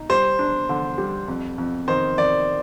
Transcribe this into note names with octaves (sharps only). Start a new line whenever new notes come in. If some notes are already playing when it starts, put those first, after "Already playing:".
Already playing: D#4
G3 C5
D4
D3
G3
F2
F2
D#3 C5
D#3 D5